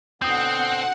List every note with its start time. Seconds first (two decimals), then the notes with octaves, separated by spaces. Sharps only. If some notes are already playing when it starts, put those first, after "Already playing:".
0.22 B2 D3 B3 C4 F#5 D#6 G6